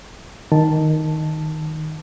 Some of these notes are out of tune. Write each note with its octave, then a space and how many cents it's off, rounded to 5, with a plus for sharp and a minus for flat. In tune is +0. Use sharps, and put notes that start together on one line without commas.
D#3 +0 A5 +0